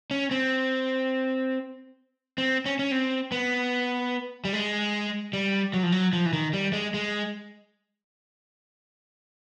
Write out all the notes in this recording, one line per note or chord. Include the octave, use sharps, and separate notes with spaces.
C#4
C4
C4
C#4
C#4
C4
B3
G3
G#3
G3
F#3
F3
F#3
F3
E3
D#3
G3
G#3
G#3